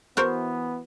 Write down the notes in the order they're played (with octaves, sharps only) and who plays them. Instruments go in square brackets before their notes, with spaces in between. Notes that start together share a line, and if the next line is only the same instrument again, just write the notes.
[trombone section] E3 B3 [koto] F#4 A#4 C5